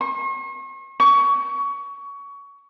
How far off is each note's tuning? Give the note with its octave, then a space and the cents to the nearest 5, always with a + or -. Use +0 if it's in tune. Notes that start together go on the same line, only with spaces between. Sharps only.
C#6 -45
C#6 +25